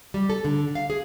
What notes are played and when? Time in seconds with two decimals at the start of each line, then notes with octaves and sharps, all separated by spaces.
0.14 G3
0.30 A4
0.45 D3
0.75 F5
0.90 G#4